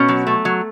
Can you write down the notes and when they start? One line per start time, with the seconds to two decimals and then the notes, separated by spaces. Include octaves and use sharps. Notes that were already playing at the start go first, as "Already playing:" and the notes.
Already playing: B2 C#4
0.09 F#3
0.27 A3
0.45 F#3